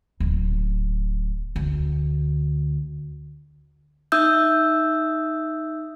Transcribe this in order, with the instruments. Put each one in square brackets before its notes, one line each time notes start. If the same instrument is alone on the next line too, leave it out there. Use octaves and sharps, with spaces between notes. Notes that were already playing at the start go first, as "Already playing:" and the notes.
[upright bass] D1
D2
[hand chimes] D#4 E5 D#6 E6 G6